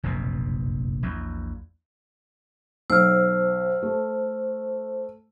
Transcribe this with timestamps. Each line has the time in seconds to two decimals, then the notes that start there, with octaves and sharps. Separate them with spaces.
0.03 F1 A#1 F#2 B2
1.03 A#1 E2
2.90 B1 C5 E6 F6
3.82 A3